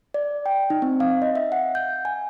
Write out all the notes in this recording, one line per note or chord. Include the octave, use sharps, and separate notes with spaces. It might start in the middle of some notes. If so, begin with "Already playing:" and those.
D5
G5
D#4
C4
F5
D#5
E5
F#5
G6
G#5